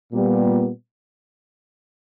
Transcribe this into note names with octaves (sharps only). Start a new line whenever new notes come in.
A#2 G3 B3